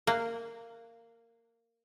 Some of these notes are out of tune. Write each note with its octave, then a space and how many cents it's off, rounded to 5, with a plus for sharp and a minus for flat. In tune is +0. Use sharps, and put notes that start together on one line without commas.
A#3 -15